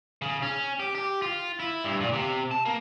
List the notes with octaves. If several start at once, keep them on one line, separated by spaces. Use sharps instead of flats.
C#3
C#4
G4
G4
F4
E4
G2
A#2
C3
A5
A#3